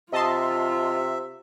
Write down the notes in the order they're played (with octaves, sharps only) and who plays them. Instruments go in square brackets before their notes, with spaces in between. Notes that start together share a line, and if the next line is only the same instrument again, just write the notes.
[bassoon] C3 [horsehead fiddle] F4 [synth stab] D#5 A5 C6 [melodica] E5